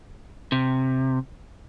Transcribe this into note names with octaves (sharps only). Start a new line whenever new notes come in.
C3